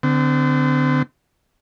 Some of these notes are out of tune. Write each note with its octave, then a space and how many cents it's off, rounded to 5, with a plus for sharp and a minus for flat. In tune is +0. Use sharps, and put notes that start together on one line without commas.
D3 +0 C4 -35